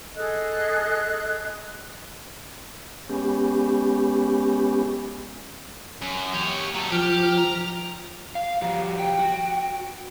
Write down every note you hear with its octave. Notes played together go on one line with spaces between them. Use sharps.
G#4 A4 D#5 F#6
G#3 B3 C#4 G4
F#2
G4 C#5
F#3 A4
F3 G4 F6
A#5
F5
F3 F#4 G4
G5
F#4